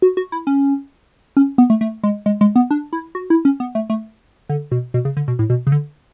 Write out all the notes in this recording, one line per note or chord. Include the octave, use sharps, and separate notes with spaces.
F#4
F#4
E4
C#4
C#4
B3
A3
A3
G#3
G#3
G#3
B3
D4
E4
F#4
E4
C#4
B3
A3
A3
D3
B2
B2
C#3
D3
B2
A2
B2
C#3
D3